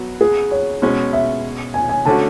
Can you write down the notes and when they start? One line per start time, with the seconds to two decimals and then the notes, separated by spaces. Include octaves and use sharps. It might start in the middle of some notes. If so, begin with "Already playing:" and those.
Already playing: F#3 B3 F#4
0.21 G#4
0.51 C#5
0.82 B2 G#3 C#4
1.13 E5
1.74 G#5
1.89 G#5
2.05 D3 A3 C#4 F#4 A5